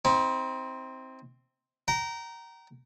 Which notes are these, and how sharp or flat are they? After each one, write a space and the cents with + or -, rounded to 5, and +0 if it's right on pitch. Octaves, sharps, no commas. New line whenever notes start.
C4 +0 D#4 +45
G5 -35 A#5 +0